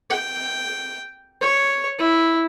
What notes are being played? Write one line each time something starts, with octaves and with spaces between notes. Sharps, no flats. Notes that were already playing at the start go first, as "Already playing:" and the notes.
G5
C#5
E4